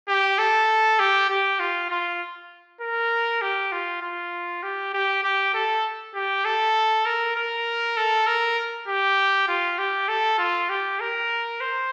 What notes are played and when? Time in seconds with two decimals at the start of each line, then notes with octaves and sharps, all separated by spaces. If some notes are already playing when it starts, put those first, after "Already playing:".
0.08 G4
0.38 A4
0.99 G4
1.30 G4
1.60 F4
1.90 F4
2.81 A#4
3.42 G4
3.72 F4
4.02 F4
4.63 G4
4.93 G4
5.24 G4
5.54 A4
6.14 G4
6.45 A4
7.05 A#4
7.36 A#4
7.97 A4
8.27 A#4
8.88 G4
9.48 F4
9.79 G4
10.08 A4
10.39 F4
10.69 G4
11.00 A#4
11.61 C5